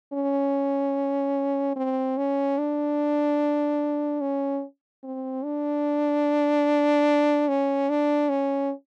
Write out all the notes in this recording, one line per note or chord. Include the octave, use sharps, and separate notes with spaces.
C#4
C4
C#4
D4
C#4
C4
D4
C#4
D4
C#4